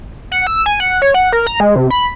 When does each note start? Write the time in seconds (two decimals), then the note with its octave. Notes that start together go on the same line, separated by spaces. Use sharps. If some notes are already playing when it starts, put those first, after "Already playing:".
0.32 F#5
0.47 E6
0.66 G#5
0.80 F#5
1.02 C#5
1.14 F#5
1.32 A#4
1.47 A#5
1.60 G#3
1.76 C3
1.91 B5